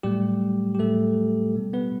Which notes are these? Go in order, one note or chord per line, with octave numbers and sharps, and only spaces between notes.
A2 F#3 G3 A3 G4
G4
A2 F#3 A3 A4
B2 G3 B3
B3 B4